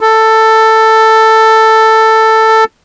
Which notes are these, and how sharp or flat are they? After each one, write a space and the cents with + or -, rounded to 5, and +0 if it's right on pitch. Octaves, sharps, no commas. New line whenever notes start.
A4 +10